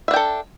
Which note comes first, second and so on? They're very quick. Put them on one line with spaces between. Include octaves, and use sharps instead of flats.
E5 D4 G5 A4